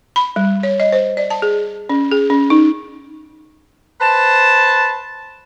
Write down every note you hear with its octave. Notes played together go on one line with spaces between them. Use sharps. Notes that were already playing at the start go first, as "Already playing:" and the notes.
B5
G3
C#5
D#5
C5
D5
A5
G#4
C#4
G#4
C#4
D#4
B4 C5 A5